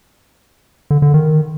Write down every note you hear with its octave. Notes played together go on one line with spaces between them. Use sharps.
D3
D3
D#3